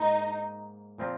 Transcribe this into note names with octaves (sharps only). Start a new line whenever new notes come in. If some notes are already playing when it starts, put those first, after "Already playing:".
Already playing: G#2 A#3 D#4
A#2 F3 C4 F4 A#4